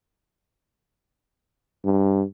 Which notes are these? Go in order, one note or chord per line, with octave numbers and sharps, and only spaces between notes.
G2